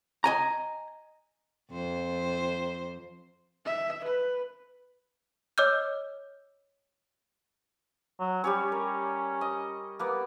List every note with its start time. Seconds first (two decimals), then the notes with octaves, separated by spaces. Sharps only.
0.24 D#5 G#5 A#5
1.70 F2 C5
3.66 E5
4.04 B4
5.58 C#5 D#5 D6 E6 F6 G6
8.20 F#3
8.44 G3 C#4 G4 C#5
8.72 A#4
9.41 D#5
9.99 A#3 B3 D5